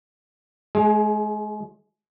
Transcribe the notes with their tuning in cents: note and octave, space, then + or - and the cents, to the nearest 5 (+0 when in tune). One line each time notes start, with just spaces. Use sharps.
G#3 +35 G#4 -5